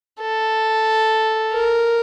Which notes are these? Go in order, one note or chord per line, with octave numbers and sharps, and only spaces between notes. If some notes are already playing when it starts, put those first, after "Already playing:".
A4
A#4